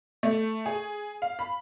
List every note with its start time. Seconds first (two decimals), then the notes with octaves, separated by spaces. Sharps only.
0.23 A3
0.66 G#4
1.22 F5
1.39 B5